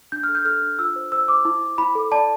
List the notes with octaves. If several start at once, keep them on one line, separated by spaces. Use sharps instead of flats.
D4 G6
F6
A4
G6
A4 F6
D4
F4 E6
C5
C5 E6
C5 D6
E4
E4
E4 B5
A4
D5 A5